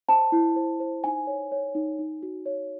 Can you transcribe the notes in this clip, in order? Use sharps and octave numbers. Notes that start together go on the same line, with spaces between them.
C5 A5
E4
C5
C5
D#4 G#5
C#5
C#5
D#4
D#4
F#4
C#5